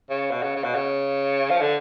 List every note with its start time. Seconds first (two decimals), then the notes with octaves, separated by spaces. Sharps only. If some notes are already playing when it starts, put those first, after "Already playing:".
0.10 C#3
0.31 B2
0.43 C#3
0.55 C#3
0.64 B2
0.75 C#3
1.50 F3
1.61 D3